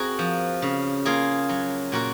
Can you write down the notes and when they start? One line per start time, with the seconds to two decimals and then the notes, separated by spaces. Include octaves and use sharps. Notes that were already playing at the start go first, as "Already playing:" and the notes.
Already playing: C4 F#4 G#4 A#4
0.19 F3
0.62 C#3
1.05 A#3 F4 G#4
1.49 F#3
1.92 A#2 F#4 A#4